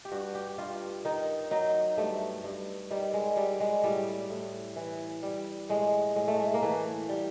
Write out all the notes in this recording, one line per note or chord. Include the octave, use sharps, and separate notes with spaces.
G4
G2 F#4
G4
G2 F4
D#3 D#4
F#3 D#4
G2 A3
G2
D#3 G3
G#3
F#3 G3
G#3
A2 G3
A2
E3
G3
A2 G#3
A2 G#3
A3
G#3
A#3
E3 A3
G3